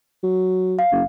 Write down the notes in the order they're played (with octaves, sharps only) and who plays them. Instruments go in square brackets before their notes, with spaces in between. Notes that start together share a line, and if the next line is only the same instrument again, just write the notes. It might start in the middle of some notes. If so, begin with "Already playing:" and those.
[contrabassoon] F#3
[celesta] F5
[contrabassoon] F#1